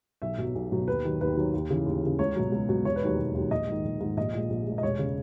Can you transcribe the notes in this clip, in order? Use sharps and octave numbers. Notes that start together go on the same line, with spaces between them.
B1 E5
B2 F#3
B1
B2 F#3
D#2 B4
D#3 F#3
D#2 B4
D#3 F#3
D#2
C#3 E3
D#2
C#3 E3
C#2 C#5
B2 F#3
C#2
B2 F#3
E1 C#5
B4
D#2 D#3 F#3 C#5
E1
D#2 D#3 F#3
A#1 D#5
G#2 D#3
A#1
G#2 D#3
A#1 D#5
A#2 G#3
A#1
A#2 G#3
D#5
E1 C#5
C#3